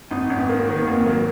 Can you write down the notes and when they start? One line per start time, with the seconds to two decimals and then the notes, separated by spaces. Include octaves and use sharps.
0.11 G#1 D#4
0.21 D#4
0.30 G#1 C#4
0.39 B3
0.49 A#3
0.68 D#3
0.76 B3
0.87 G#1 A#3
1.06 F#3 A#3